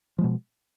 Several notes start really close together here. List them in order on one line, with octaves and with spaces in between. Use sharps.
F3 G#3 B2